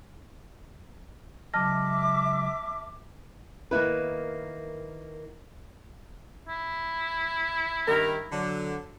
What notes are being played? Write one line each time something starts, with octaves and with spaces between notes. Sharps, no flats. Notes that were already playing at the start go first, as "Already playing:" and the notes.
C#2 F#3 D#5 E5 A5 D6 F6 A#6
D#3 A#3 B3 E4 B4
E4
G2 D#3 A#4
D3 F#3